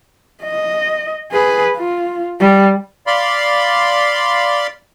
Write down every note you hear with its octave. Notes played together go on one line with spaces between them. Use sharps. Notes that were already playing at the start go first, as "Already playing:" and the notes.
D#5
G#4 B4
F4
G3
D5 F5 B5 C6